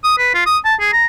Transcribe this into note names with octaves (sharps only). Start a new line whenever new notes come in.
D#6
B4
F4
D#6
A5
G#4
A#5